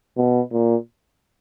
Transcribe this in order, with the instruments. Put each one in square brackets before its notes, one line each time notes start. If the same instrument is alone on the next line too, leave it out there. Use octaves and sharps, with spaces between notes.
[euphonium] B2
A#2